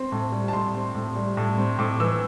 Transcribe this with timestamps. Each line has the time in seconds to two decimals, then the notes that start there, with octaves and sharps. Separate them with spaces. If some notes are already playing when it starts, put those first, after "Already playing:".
Already playing: C4 C6
0.12 A2
0.32 G3
0.48 A5
0.53 A2 C6
0.75 C4
0.95 A2
1.16 G3
1.37 A2
1.57 C4
1.78 A2 D6
2.00 E3 E6